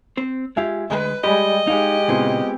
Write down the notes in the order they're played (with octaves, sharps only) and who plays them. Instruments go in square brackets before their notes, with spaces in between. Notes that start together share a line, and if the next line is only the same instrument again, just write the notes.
[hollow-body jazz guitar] C4 C5
[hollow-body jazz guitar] G#3 F4 G4 [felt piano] E5 G#5
[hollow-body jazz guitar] D2 G#3 [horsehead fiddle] B4 [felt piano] D#5
[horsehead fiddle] G3 G#3 [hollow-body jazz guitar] G4 [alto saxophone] D#5 [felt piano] B5
[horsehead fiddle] G#3 G4 [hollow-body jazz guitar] D#4 [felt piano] F5
[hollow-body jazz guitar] A#2 C#3 E4 [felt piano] B3 C4 F4